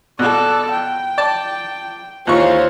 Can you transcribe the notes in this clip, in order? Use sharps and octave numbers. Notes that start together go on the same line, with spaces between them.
B2 A4 D5
G5
D5 A5
D#2 E3 G#3 F4 C5 C#5 C#6